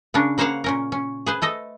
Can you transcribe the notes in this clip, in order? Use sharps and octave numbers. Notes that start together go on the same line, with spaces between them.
C#3 C#4 D4 A#4
C#3 A#3 C5 C#5 F5 F#5
A#2 C#4 A#4
C#4
G#4 B4 C5
A3 A4 D#5